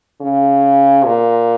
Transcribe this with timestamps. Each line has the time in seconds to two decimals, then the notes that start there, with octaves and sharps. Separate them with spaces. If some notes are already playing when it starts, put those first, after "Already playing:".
0.21 C#3
1.05 A#2